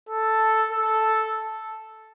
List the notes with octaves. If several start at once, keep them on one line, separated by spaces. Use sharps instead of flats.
A4
A4